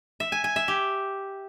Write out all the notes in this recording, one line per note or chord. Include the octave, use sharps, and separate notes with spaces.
E5
G#5
G#5
E5
G4